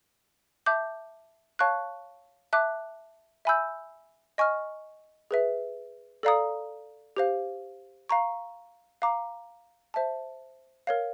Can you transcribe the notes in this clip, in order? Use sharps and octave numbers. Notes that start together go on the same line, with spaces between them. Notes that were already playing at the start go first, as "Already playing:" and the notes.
E5 A5 D6 G6
C#5 F5 A5 C#6 F#6
E5 A5 D6 F#6
E5 G#5 B5 E6 G6
D#5 G#5 C#6 F6
G#4 B4 E5
A4 D5 F5 A#5 D#6
G4 C5 F5
F5 A#5 C#6
F5 A#5 D6
C5 E5 A5
A#4 C#5 F5